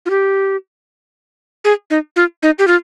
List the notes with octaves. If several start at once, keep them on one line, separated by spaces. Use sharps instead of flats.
F4
G4
G#4
D#4
F4
D#4
G4
F4